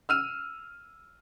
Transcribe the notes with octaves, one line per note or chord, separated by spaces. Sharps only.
E6 F6 D#7